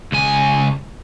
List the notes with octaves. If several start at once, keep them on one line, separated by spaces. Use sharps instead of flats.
C#2 G#5